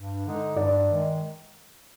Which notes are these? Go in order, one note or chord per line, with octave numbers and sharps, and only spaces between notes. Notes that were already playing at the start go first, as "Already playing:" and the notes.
Already playing: G2
D3 G#3 D#4
G2 D5
D#3 G#3